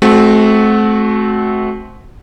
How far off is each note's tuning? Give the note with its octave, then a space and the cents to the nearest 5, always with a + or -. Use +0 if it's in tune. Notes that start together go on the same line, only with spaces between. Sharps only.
A3 -35 C4 +0 F#4 +0